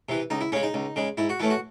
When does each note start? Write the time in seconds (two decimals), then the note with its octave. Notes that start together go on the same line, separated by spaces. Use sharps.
0.09 C3 E3
0.30 C#2 D#4
0.41 E4
0.52 C#3 G#3 C#4
0.63 D#4
0.74 C#2
0.96 C#3 G#3
1.17 G#2 E4
1.29 F#4
1.39 E3 A3 C#4 E4
1.50 F#4